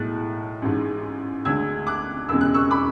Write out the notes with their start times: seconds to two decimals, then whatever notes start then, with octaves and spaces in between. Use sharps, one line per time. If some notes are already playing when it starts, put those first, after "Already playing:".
Already playing: B1 A2 G#3 F#6 A6
0.62 A1 G#2 G#3
1.45 D2 D3 G#3 E6 G#6
1.87 D6 F#6
2.29 E1 E2 C#3 G#3 E6
2.41 F#6
2.54 C#6 E6
2.71 B5 D6